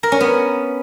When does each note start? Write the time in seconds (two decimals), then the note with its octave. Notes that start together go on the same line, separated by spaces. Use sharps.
0.03 A#4
0.12 C#4
0.21 B3